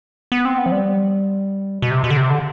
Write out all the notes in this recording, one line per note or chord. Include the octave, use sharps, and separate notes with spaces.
B3
C4
B3
F3
G3
B2
C3
B2
D3
C3
D3